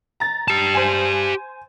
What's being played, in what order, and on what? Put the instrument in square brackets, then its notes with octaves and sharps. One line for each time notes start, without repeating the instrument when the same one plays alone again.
[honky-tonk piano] A#5 A6
[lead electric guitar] G4 A5
[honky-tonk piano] C5 G#5